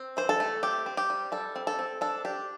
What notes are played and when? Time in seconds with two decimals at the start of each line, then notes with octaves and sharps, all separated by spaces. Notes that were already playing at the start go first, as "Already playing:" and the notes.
Already playing: C4
0.17 E3 C5
0.29 A4
0.40 A3
0.63 C4 G4
0.86 C4
0.97 G4
1.10 G3
1.32 G3 A4
1.56 C4
1.67 A4
1.79 C4
2.01 D4 A4
2.25 D4 G4